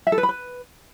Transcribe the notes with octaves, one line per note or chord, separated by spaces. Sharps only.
E5
A4
B4
B5
B4